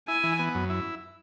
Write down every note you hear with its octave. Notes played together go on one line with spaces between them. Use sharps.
E4 G#5
E3
B3
F#2
E4